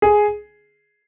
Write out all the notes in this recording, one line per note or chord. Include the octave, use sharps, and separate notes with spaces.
G#4